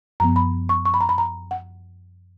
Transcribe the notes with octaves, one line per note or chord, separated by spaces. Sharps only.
F#2 F3 B3 A#5
B5
C#6
C#6
B5
A#5
B5
A#5
F#5